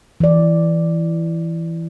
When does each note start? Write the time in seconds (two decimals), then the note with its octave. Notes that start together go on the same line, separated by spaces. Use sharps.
0.20 E3 D5